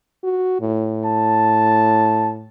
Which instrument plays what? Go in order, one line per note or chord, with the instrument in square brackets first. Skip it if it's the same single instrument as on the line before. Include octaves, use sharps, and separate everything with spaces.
[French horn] F#4
A2
[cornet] A5